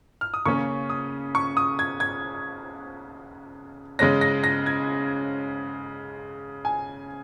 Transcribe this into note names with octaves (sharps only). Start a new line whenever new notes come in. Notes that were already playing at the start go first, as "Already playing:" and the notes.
F6
D#6
C#3 A#3 C#4 C#6
D#6
C#6
D#6
G#6
G#6
C#3 G#3 C#4 A#6
A#6
A#6
G#6
G#5